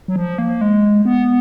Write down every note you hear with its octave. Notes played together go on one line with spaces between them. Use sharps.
F#3
F3
A#3
G#3
B3